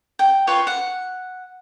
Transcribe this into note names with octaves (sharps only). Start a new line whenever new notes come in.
G5
F4 B4 C#5 G5
F#5